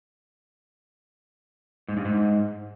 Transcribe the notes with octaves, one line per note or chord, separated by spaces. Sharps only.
G#2
G2
G#2